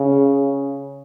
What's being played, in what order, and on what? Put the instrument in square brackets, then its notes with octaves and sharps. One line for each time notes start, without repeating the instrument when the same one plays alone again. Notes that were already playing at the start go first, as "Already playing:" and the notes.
Already playing: [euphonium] C#3